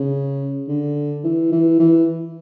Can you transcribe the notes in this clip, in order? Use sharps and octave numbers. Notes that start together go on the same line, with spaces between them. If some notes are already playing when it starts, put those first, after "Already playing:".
Already playing: C#3
D3
E3
E3
E3